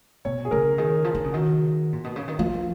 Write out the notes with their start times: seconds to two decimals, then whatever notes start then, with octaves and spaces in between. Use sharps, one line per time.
0.25 B2 C#5
0.45 G#4
0.51 C#3 A#4
0.78 D#3 G#4
1.04 F3
1.15 D#3
1.24 C#3
1.32 D#3 F#4
1.93 A#2
2.04 B2
2.16 C#3
2.28 D#3
2.39 F3 F4